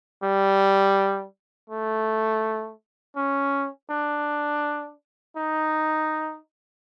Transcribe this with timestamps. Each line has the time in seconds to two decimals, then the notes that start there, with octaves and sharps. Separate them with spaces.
0.23 G3
1.70 A3
3.16 C#4
3.90 D4
5.37 D#4